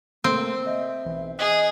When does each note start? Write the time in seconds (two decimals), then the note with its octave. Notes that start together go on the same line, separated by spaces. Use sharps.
0.24 C3 A3 A#3 C4 A4
0.67 D#5 E5
1.05 B1 E3
1.39 G#4 D#5 D#6 F#6